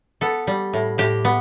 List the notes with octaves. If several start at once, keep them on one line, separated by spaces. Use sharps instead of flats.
B3 A4
G3
A2
A2 G4
B3